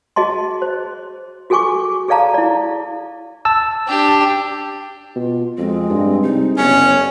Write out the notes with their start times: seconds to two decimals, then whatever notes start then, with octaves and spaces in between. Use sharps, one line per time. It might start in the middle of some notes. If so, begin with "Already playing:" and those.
0.16 F#4 G#4 D#5 A5 C6
0.62 C5
1.50 F#4 G#4 A4 G#5 C#6 D6
2.08 G#4 A4 D5 F5 A5 A#5
2.34 E4 D5
3.45 A5 E6
3.87 D4 G4
5.15 B2 F4
5.58 F2 G#3 C4
5.90 G2
6.23 C3 D#4
6.57 F#1 B3 C#4 C#5